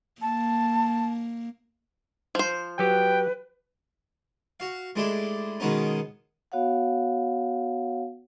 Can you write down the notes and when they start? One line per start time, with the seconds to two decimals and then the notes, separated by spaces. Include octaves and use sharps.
0.22 A#3 A5
2.35 F3 C5
2.79 F#3 G4 B4 G5
4.60 F#4 F5
4.96 G#3 A3 D4 E4 G4
5.60 B2 D#3 G#3 B3 C#4 D#4
6.52 B3 F#4 C#5 F5 F#5